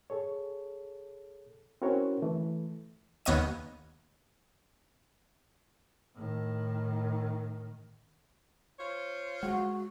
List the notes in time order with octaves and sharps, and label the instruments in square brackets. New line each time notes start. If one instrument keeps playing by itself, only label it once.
[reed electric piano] G#4 A4 C#5
C4 C#4 E4 F#4 A#4 C#5
E3 A3
[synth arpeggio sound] D#2 B3 C#5 D#5 D#7
[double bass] A2 D#3
[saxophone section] F4 C5 C#5
[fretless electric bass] G#3 [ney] F#4 [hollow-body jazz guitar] F#5